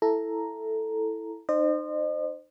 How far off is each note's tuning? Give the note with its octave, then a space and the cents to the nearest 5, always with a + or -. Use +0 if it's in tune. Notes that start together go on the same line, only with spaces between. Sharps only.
E4 +0 A4 +0 A#5 +0
D#4 -30 C5 +0 D#5 -40